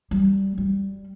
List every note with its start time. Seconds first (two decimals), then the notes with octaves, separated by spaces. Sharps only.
0.11 G3
0.58 G3